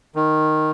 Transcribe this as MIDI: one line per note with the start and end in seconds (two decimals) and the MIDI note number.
0.15 0.71 51